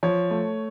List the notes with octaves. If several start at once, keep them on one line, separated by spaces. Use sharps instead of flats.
F3 C#5
A3